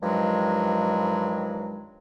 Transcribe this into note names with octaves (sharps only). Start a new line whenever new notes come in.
G2 D#3 F3 F#3 G#3